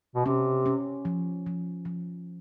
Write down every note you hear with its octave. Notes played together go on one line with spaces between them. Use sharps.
B2
C3 C#4
C#4
F3
F3
F3